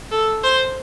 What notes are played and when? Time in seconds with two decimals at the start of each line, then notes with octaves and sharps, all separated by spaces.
0.12 A4
0.44 C5